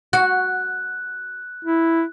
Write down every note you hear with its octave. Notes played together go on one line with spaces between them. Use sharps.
F#4 F#6
E4